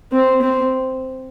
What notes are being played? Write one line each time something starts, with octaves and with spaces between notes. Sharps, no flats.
C4
C4